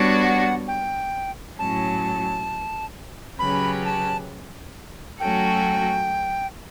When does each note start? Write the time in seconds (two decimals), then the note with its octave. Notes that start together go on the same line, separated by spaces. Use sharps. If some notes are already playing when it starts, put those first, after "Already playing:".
Already playing: G3 B3 D4 F#4 C#5
0.22 F#5
0.68 G5
1.58 A2 F#3 C#4 A5
3.39 C#3 F#3 C#4 G4 B4 B5
3.85 A5
5.20 F#3 A3 C#4 F#4 A4 G5